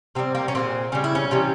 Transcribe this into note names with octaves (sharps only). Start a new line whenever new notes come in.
C3 E3 G3 C4
A#3
C#4
A#2 F3 G#3 C4
C#3 G3 C#4
E4
C#4
C3 E3 G3